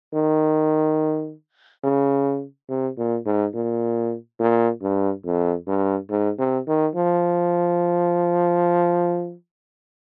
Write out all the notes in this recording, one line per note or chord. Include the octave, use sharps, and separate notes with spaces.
D#3
C#3
C3
A#2
G#2
A#2
A#2
G2
F2
G2
G#2
C3
D#3
F3